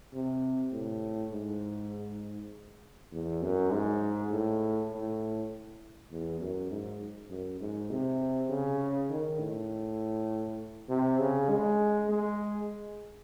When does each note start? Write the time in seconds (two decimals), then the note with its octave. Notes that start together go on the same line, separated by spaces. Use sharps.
0.14 C3
0.73 A2
1.33 G#2
3.12 E2
3.42 F#2
3.72 G#2
4.32 A2
4.92 A2
6.12 E2
6.40 F#2
6.71 G#2
7.30 F#2
7.61 G#2
7.90 C3
8.50 C#3
9.10 D#3
9.40 A2
10.89 C3
11.19 C#3
11.49 G#3
12.09 G#3